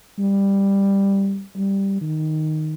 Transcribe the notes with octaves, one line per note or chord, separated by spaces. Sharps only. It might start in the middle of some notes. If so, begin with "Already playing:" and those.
G3
G3
D#3